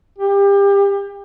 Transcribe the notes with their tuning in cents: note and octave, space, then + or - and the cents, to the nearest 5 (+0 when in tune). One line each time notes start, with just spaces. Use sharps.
G4 +30